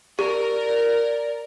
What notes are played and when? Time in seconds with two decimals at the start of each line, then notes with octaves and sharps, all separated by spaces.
0.19 G4 A#4 D5